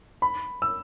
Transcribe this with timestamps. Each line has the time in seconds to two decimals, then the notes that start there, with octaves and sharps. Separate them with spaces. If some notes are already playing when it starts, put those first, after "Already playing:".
0.22 B5
0.62 E6